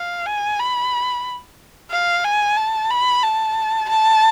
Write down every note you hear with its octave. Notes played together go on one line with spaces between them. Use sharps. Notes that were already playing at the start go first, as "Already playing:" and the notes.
Already playing: F5
G#5
B5
F5
G#5
A5
B5
A5
A5